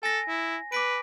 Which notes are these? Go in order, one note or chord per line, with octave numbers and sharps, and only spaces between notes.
A4 G#5 A#6
E4
B4 D6 B6 D7